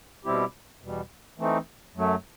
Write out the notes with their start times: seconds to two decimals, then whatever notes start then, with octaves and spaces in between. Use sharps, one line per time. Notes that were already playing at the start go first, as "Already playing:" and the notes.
0.25 B2 G3 C4 E4 G4
0.81 E2 B2 G3
1.38 E3 A3 C4 D#4
1.95 F#2 F#3 A3